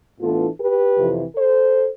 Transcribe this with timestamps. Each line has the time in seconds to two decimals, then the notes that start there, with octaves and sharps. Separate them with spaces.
0.21 A2 E3 B3 D4 F4 A4
0.59 G4 B4
0.97 F2 C3 E3
1.35 A4 C5